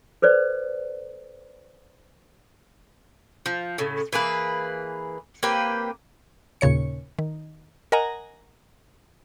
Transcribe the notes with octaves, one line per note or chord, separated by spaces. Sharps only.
A4 B4 C5 D5
F3
A2 C#3
E3 A#3 G#4 B4
A#3 C4 G4 B4
D#2 A#2 C#3 C#5 C#7
D#3
A#4 D#5 F#5 G#5 A#5